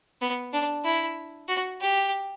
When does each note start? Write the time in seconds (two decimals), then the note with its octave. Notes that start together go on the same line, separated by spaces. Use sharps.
0.21 B3
0.53 D4
0.85 E4
1.48 F#4
1.81 G4